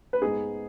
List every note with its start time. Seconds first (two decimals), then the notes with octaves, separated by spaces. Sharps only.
0.13 B4
0.21 G#2 G#3 B3 D#4 G#4